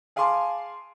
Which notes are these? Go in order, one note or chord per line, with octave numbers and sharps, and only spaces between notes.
G#4 F5 G#5 A5 C6 D6